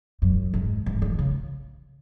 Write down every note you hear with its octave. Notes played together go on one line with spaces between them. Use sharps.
F#2
G#2
G#2
D#3
C#3